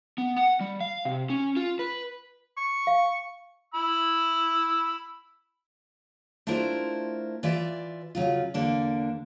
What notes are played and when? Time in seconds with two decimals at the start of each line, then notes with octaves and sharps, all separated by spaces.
0.18 B3
0.37 F#5
0.60 G3
0.81 F5
1.05 C3
1.30 C#4
1.56 F4
1.79 B4
2.57 C#6
2.87 F5
3.74 B5 E6
6.47 A3 D4 E4 F4 A#4 C5
7.43 E3 F4 D5 E5
8.15 C#3 F#3 F4
8.54 E2 D3 A#3 D4